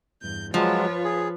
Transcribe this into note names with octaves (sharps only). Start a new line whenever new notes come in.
E2 G2 G6
F3 F#3 G#3 F4 B4 C#5
G#4